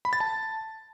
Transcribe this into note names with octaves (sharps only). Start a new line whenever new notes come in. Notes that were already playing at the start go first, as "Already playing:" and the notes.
B5
A6
A5